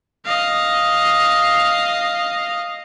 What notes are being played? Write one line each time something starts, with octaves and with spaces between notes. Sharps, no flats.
D#5 F5